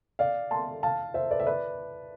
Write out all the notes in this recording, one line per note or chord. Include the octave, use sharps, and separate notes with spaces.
D5 F5
A5 C6
F5 A5
C5 E5
B4 D5
E5
B4 D5